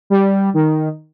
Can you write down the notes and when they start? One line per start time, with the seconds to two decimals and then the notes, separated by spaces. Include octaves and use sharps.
0.10 G3
0.54 D#3